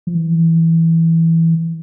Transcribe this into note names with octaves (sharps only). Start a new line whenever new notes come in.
F3
E3